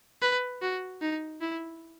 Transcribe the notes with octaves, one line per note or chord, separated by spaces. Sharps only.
B4
F#4
D#4
E4